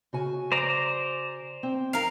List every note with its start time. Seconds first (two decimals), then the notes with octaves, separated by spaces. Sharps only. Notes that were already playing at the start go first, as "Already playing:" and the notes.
0.13 C#3 F#4 G#5
0.52 C5 D5 A#5
1.63 C4
1.93 A#4 F5